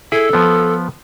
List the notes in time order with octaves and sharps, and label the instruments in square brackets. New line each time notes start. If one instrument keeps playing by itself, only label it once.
[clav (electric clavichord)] E4 G#4 [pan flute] A4
[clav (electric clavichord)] F3 B3